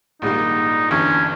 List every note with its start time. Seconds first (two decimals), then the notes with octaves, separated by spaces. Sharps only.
0.22 A#1 G#2 D#3 G3 A#3 D#4
0.91 G1 G2 E3 C#4